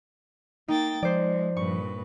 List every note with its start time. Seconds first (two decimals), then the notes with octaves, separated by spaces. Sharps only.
0.68 A#3 D#4 G5 A6
1.03 F3 G#3 C5 D5
1.57 G2 A#2 B4 C#6